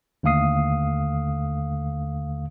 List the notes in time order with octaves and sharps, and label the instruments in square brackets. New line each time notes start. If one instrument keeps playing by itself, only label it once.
[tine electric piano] D#2 D3 A3 F5 D#6 C7